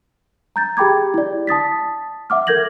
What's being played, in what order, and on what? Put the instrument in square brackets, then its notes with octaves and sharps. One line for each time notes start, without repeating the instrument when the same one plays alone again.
[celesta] A#5 G6 A6
G4 G#4 G5 B5 D6 G#6
E4 D5
A5 D#6 A6 B6
E5 F#5 D6 F6
A4 A#4 G6 G#6 A#6 F#7